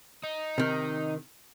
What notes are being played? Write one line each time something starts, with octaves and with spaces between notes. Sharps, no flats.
D#4
C3 D#3